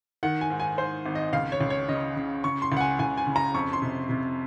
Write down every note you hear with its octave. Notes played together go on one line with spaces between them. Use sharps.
D#3 F#5
G#5
G#2
G#5
G#2 C5
G#1
D#5
C#2 F5
C#5
C#2
C#5
C#3 D#5
C#3
C#3 C#6
C6
C#2 F#5
G#5
C#2 G#5
G#5
C#3
A#5
F2 C#6
C6
C3
C3